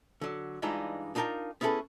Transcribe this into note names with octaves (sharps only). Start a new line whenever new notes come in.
D3 F#3
G2 E3 G#3 D4 D#4 F4
D4 D#4 F4 A#4 G5 A5
B3 C#4 E4 G#4 A4 B4